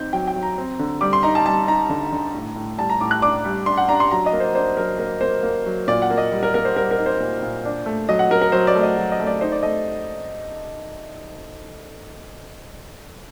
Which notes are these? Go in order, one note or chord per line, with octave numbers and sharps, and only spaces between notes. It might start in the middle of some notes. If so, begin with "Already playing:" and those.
Already playing: C4 D#4 G6
F#3 G5
G5
F#3
A#5
C4
D3
G3 D6
C6
D#4 A#5
A5
G3 A5
D#4 A#5
D3
D3
A2
A2
G3 A5
A#5
A2 D6
F#6
D4 D6
G3
D4 C6
F#5
D4 A#5
C6
F#3 A#5
D#5
A#3
C5
D4 C5
F#3 A#4
A#3 A#4
A#3 C5
A#3
F#3
A#2 D5
F#5
A#3
D#5
G3
A#4
A#3 A#4
C5
G3 A#4
A#4
D#4
C5
A#2
A#2
D4
A3
F#3 D#5
F#5
F#3 A#4
A#4
F#3 C5
D5
A3
D#5
F#3
D#5
A3
D5
D#4 C5
D5
A3 D#5